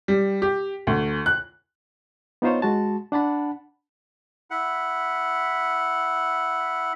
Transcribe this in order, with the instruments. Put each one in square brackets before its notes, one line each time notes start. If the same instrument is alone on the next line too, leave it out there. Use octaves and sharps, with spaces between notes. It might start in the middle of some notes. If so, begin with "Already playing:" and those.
[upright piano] G3
G4
D2
F#6
[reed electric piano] B3 D#4 F4 C5 C#5
G#3 F#4 A5
D4 F#5 A5 B5
[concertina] E4 F#5